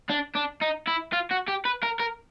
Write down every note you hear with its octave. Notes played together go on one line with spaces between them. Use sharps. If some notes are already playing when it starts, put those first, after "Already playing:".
D4
D4
D#4
E4
F4
F#4
G4
B4
A#4
A#4